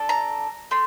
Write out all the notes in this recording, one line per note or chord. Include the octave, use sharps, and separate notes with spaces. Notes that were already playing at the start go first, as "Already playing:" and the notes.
Already playing: D4 A4
A#5
A3 C6